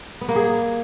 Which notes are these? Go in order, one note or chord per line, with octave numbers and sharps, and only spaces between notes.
B3
A#3
G#4